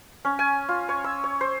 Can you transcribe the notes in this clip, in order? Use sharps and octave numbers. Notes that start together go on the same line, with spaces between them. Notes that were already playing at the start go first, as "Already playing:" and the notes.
C#4
G#5
F4
C#5
E6
C#5
C5